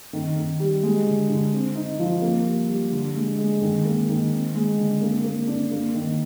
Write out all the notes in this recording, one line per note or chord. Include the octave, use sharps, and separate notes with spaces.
D#3
D#3
G3
G#3
D3
D3
C4
D#4
F3
A#3
G3
G3
D3
G#3
G#3
D#3
A#3
D#3
C4
G#3
D3
A#3
A#3
D4
A#3
D#3